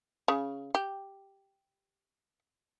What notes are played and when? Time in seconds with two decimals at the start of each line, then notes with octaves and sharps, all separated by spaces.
0.28 C#3
0.75 G4